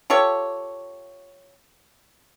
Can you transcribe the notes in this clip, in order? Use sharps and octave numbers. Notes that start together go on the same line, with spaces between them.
F4 G4 A4 C#5